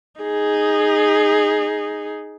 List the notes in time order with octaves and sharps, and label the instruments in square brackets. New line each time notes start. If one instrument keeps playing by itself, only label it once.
[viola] D#4 G#4